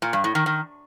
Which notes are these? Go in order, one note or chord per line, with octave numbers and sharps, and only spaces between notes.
A#2
G2
A2
D#3
D#3